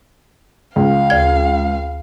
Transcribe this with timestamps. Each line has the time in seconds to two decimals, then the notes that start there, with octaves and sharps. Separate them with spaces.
0.76 C#2 F5
1.10 D2 G#6